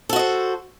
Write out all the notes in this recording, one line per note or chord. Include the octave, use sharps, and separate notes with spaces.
F#4 A4 C5 D#5